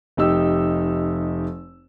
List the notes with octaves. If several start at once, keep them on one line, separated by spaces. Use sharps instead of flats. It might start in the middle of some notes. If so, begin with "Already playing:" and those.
F1 D#4 G4 E6